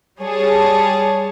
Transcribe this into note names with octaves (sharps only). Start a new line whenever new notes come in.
G3 G#4 C#5 A5